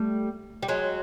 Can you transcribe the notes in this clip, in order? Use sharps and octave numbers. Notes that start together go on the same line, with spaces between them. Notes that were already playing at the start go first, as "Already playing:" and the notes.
Already playing: G3 A3
G3
F#3 G#3